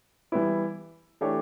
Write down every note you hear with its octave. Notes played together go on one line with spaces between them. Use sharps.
E3 G3 B3 E4
E3 A3 D4 G4 C#5